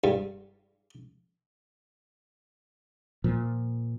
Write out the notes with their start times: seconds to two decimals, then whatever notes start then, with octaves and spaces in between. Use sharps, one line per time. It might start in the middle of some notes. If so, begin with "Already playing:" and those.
0.04 G2
3.24 A#2 F3